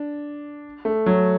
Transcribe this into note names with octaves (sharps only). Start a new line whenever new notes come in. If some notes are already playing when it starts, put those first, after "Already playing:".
Already playing: D4
A3
F#3